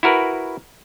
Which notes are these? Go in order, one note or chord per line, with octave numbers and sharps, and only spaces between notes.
E4 F#4 A#4 B4